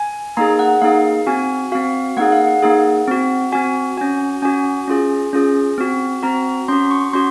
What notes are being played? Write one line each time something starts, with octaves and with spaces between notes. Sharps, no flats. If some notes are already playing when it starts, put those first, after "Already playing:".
Already playing: G#5
A#3 D#4 G#4 A#5
F#5
A#3 D#4 G#4 F5
C4 F#4 G#5
C4 F#4 F5
A#3 D#4 G#4 F#5
F5
F#5
A#3 D#4 G#4
C4 F#4
C4 F#4 G#5
C#4 F#4 G#5
C#4 F#4 G#5
C#4 F4 G#4
C#4 F4 G#4
C4 F#4
C4 F#4 A#5
C#4 F#4 C6
C#6
C#4 F#4 C6